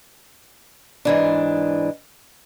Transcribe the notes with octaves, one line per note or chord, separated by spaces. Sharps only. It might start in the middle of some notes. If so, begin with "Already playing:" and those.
G#2 E3 D4